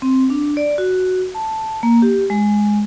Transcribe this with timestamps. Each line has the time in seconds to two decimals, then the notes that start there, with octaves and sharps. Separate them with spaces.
0.02 C4
0.30 D4
0.57 D5
0.78 F#4
1.35 A5
1.83 A#3
2.02 G4
2.30 G#3